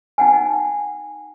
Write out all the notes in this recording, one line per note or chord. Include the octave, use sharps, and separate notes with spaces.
D#4 F#5 G#5